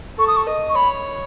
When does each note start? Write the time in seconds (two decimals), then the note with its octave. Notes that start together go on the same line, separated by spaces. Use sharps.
0.18 A4 C#6
0.28 D#6
0.37 C#6
0.47 D#5
0.70 C#6
0.76 C#5 B5